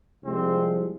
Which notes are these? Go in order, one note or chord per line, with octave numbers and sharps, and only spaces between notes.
C2 C3 F3 G#3 C4